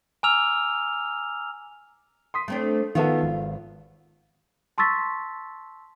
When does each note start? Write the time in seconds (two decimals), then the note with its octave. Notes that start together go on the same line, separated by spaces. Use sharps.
0.23 G#5 A#5 D6 E6 F6 F7
2.34 C6 D#6 B6
2.48 A3 C4 D4
2.95 D#3 B3 F4 F#4 A4 E5
3.22 G#1
4.78 A5 C6 C#6 E6 A6 B6